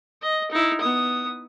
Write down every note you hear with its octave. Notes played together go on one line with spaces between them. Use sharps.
D#5
D#4 E4
B3 D#6